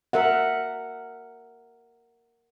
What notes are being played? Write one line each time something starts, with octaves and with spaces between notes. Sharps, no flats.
A#4 E5 F#5